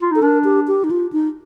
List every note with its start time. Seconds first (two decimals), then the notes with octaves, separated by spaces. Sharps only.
0.02 F4
0.12 D#4 A4
0.22 D4 A#4
0.44 G4
0.67 G4
0.84 D#4
0.91 F4
1.13 D#4